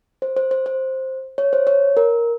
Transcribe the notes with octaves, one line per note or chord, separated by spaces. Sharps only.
C5
C5
C5
C5
C#5
C5
C#5
A#4